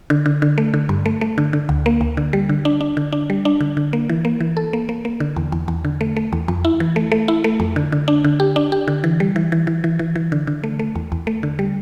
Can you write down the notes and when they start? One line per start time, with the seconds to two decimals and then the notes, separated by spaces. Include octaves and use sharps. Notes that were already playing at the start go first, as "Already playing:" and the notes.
0.10 D3
0.26 D3
0.42 D3
0.58 A3
0.74 D3
0.89 G2
1.06 A3
1.21 A3
1.38 D3
1.53 D3
1.69 D2
1.86 A#3
2.01 D2
2.17 D3
2.33 G3
2.49 D3
2.65 D4
2.81 D4
2.97 D3
3.13 D4
3.30 G3
3.45 D4
3.61 D3
3.77 D3
3.93 A#3
4.09 E3
4.25 A#3
4.40 E3
4.57 A4
4.73 A#3
4.89 A#3
5.05 A#3
5.20 D3
5.36 E2
5.52 E2
5.68 E2
5.85 D3
6.01 A3
6.17 A3
6.33 E2
6.48 F2
6.65 E4
6.80 E3
6.96 A3
7.12 A3
7.28 E4
7.44 A3
7.60 F2
7.76 D3
7.92 D3
8.08 D4
8.24 D3
8.40 G4
8.56 D4
8.72 G4
8.88 D3
9.04 E3
9.20 G3
9.36 E3
9.52 E3
9.67 E3
9.84 E3
9.99 E3
10.16 E3
10.32 D3
10.47 D3
10.64 A3
10.79 A3
10.95 E2
11.12 E2
11.27 A3
11.43 D3
11.59 G3